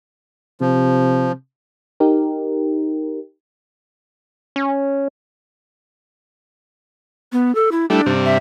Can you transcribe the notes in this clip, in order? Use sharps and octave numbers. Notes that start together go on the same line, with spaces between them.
C3 F3
D#4 G4 A#4
C#4
B3
A4
E4
G3 A3 D4 E4
G2 C3
E5